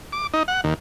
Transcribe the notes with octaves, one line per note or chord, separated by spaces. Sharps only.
D6
D#4
F#5
D#2